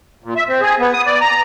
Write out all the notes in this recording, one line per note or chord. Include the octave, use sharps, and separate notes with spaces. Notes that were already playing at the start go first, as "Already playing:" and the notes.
A#2
E5
C4
G#4
B3
D#6
D5
A#5